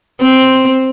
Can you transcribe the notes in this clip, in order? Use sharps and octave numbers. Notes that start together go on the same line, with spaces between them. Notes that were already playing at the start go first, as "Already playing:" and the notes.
C4